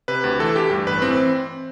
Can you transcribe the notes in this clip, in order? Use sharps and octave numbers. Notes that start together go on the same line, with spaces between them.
C3 B4
D2
E3 A4
D2 G4
G2
A1 B4
E3 C4